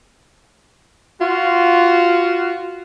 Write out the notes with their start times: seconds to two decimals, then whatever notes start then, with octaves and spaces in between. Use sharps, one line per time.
1.21 F4 F#4